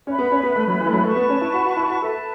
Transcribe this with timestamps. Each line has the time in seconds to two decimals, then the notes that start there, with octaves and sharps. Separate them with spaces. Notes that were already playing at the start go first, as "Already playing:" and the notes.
0.07 C#4 B4 E5 B5
0.19 B3
0.32 C#4
0.43 B3
0.56 A3
0.68 F#3
0.81 E3
0.87 A3
0.93 F#3
1.04 A3 B4 A5 C#6
1.16 B3
1.29 C#4
1.41 E4
1.53 F#4
1.65 F#4
1.77 E4
1.89 F#4
2.02 A4 B4 E5 A5